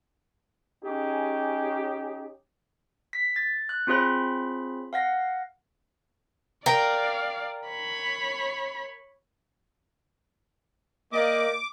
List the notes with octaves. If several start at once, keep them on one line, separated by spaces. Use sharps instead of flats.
C#4 D#4 G4 G#4
B6
A6
F#6
C4 F4 G#4 C#5 B5
F5 F#5 A#6
A#4 D5 F5 G5
C#5 B5
A#3 G4 D5 D#5 D6